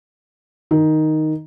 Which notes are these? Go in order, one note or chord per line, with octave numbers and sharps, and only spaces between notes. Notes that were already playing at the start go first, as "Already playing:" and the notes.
D#3